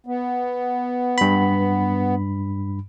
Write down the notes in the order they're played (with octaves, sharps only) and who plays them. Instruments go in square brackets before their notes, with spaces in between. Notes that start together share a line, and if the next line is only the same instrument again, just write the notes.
[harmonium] B3
[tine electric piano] G2 B5